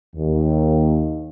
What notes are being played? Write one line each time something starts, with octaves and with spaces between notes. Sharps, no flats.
D#2